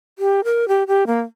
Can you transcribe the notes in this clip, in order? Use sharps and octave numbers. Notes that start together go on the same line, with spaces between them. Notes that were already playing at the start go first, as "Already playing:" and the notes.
G4
A#4
G4
G4
A#3